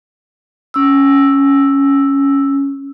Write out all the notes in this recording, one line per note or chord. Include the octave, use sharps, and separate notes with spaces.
C#4 E6